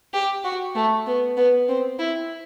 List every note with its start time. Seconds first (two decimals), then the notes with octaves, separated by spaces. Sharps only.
0.14 G4
0.44 F#4
0.75 A3
1.07 B3
1.37 B3
1.68 C4
1.99 E4